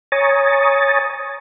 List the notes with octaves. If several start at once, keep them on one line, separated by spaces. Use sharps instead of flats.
C#5 G#5 A#5 C#6 D#6 A6